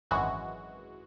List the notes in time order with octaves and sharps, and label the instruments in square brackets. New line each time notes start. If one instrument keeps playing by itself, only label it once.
[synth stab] G#1 F#2 E3 G#3 F#4